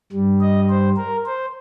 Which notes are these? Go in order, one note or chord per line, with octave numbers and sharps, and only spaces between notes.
G2 G3
D#5
C5
A#4
C5